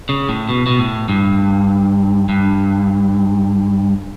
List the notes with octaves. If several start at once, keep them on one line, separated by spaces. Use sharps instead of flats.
C#3
A2
B2
B2
A2
G2
G2